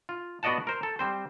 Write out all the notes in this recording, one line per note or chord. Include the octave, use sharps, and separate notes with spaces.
F4
B3 F#4 D5 D#5 F#5 A5
A#4 C5
A4
G3 C4 C5